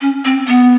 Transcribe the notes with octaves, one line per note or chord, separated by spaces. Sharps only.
C#4
C4
B3